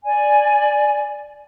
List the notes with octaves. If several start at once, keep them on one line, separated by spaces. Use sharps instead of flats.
D5 G#5